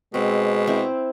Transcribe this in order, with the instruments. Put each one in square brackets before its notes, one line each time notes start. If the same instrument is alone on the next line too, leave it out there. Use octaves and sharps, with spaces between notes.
[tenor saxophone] B2 [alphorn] G#3 [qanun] C4
[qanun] C4 E4